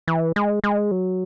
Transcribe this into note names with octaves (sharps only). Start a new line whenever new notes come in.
E3
G#3
G#3
F#3